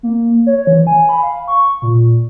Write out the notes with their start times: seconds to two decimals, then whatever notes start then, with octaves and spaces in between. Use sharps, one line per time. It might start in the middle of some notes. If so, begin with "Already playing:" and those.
0.03 A#3
0.47 C#5
0.67 E3
0.87 G#5
1.09 B5
1.23 F5
1.48 C#6
1.82 A#2